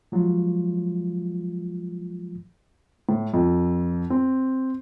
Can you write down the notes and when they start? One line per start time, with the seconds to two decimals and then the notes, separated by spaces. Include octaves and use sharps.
0.12 F3 F#3 G#3 F4
3.09 A2
3.34 F2
4.10 C4